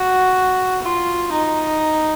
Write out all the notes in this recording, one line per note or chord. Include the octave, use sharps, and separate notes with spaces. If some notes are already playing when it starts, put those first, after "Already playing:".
Already playing: F#4
F4
D#4